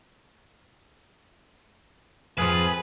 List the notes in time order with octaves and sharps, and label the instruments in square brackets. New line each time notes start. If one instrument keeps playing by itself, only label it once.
[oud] F2 F3 [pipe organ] G#4 [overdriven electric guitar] B4